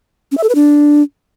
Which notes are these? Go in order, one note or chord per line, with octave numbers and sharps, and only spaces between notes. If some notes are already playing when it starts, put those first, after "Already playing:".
C#4
E5
A4
B4
D4